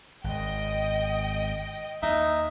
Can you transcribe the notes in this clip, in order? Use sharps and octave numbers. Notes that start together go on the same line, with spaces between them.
G#1 D#5 G5
D#2 D#4 E5